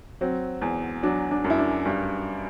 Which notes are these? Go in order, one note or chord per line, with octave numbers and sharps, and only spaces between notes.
F#3 C4
E2
F#3 D4
D4
F#2
E4
D4
G2